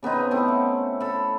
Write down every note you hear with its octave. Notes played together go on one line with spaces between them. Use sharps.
C#3 B3 C4 D#4
A3 C4 C#4 E4
F#5
A4 B5